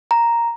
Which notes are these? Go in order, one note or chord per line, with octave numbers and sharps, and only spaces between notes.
A#5